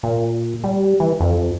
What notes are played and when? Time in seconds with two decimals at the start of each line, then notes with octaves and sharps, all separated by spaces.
0.03 A#2
0.64 G3
1.00 E3
1.20 F2